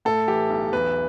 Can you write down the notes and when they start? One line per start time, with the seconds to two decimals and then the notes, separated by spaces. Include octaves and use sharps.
0.05 A2 A4
0.28 E3 G4
0.50 B1
0.72 E2 B4